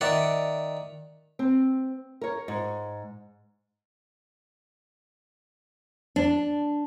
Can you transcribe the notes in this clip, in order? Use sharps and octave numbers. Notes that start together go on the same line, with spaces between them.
D#3 D5 E5 F#5
C4
A#4 C#5
G#2
D4